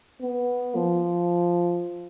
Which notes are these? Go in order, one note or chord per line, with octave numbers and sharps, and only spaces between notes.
B3
F3